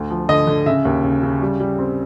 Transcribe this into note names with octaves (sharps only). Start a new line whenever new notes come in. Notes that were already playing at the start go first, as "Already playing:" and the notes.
Already playing: D2
F3
D3 D#5
D3
C#3 E5
D#2
C#3
C#3
G3
G3
C4